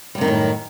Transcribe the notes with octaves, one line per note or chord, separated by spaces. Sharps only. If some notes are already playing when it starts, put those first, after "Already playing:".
F#2 A2 C3 D#3 G3